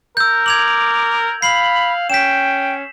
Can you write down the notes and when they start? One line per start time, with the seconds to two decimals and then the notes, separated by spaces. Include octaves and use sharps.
0.17 A#4 E6 G6
0.46 D6 G#6 F7 F#7
1.42 F5 B5 C7 F#7
2.10 C#4 G5 B6 E7